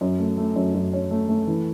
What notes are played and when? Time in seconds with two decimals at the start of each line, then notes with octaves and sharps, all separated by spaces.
0.01 F#2
0.19 A3
0.37 A3
0.56 F#2
0.74 F#2
0.93 C#4
1.11 A3
1.29 A3
1.47 E3